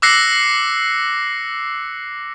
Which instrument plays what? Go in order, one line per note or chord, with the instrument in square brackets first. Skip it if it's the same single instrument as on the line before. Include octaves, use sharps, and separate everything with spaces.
[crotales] D6 E6 F#6 A#6 C7 C#7